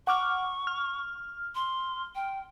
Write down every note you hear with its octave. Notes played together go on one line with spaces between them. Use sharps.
F#5 C#6 D6 F6
F6
C6
G5